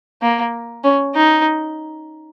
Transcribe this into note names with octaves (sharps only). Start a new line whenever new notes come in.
A#3
C#4
D#4